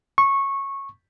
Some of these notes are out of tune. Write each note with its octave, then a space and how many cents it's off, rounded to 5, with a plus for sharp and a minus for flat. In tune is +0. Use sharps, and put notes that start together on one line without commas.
C#6 -15